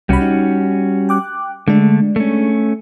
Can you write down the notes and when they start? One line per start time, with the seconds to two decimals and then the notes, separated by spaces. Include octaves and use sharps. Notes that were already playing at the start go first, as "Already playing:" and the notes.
0.09 C2 G3 C#4 F#4 B5
0.21 D#4
1.09 G5 D6 F#6
1.68 D3 G#3 A3 D4
2.16 A3 C#4